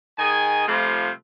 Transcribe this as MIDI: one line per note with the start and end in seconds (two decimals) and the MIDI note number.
0.19 0.66 51
0.19 0.66 68
0.19 0.66 75
0.19 0.66 80
0.68 1.10 48
0.68 1.10 53
0.68 1.10 55
0.68 1.10 57
0.68 1.10 65
0.68 1.10 72